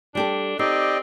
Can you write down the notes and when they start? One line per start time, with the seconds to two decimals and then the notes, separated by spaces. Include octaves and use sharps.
0.15 G3 D4 G4 A4
0.59 C4 D#4 G4 D5 D#5